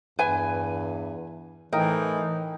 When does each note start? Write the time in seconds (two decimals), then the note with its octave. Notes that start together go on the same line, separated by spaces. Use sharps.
0.19 E2 G2 B4 G#5
1.73 A2 E3 D#4 A#4 G5